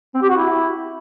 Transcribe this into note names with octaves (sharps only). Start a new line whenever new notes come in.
C4
G4
F#4
E4